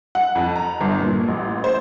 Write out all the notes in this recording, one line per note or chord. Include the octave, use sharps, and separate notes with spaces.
F#5
F2
A#5
G1
A#2
A1
C5